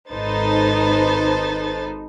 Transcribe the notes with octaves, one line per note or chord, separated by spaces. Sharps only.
G#1 D#4 A4 B4 C5 A6